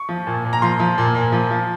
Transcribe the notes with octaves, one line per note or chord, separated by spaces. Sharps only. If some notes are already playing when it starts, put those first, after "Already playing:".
Already playing: C#6
F3
A#2
A#2
A#5
F3 C6
F3
A#2
A#2
F3
F3